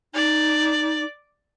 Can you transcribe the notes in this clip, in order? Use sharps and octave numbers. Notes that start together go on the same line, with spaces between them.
D#4 D5